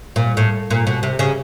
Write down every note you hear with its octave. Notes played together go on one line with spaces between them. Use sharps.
A#2
A2
A#2
B2
C3
C#3